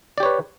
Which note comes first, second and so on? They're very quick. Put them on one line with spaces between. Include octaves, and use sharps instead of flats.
D5 G4 C#5 B4